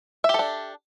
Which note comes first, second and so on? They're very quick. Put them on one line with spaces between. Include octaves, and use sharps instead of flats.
E5 G4 A4 D4